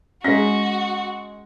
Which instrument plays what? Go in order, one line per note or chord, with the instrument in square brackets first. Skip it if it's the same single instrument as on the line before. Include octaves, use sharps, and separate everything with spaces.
[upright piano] G#3 A#6 [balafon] C#4 [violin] F#4